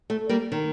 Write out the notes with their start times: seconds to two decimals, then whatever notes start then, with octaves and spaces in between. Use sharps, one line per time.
0.10 A3
0.29 G3 A#3
0.52 D#3